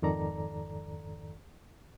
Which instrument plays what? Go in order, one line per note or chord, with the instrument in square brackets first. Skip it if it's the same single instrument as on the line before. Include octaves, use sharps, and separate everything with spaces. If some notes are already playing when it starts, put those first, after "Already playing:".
[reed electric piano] F2 G#2 D#3 A4 D5 A#5